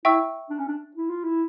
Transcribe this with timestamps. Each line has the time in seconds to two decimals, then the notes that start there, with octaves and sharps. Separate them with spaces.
0.05 E4 E5 G5 C#6 E6
0.50 D4
0.59 C#4
0.67 D4
0.96 E4
1.10 F4
1.24 E4